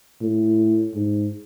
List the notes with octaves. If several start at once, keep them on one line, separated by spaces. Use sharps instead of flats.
A2
G#2